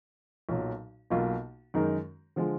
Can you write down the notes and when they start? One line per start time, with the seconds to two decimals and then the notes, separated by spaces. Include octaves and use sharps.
0.49 B1 A#2 F#3
1.10 B1 B2 A#3 F4
1.74 F#2 D#3 G#3 D#4 A#4
2.36 D3 F3 G#3